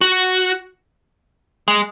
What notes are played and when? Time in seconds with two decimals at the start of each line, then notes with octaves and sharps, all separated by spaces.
0.01 F#4
1.68 G#3